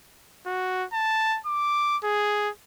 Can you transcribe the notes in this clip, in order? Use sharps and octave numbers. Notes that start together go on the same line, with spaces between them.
F#4
A5
D6
G#4